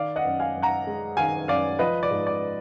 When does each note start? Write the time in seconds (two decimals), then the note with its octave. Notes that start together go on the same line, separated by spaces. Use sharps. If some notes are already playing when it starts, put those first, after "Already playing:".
Already playing: D#3 D5 F5
0.16 D#5 F#5
0.25 F#2
0.39 F5 G#5
0.55 F#2
0.62 F#5 A#5
0.87 G#3
1.17 D#3 F5 G#5
1.48 F#2 D5 F5
1.79 F3 B4 D#5
2.03 D5
2.11 G#2
2.27 D5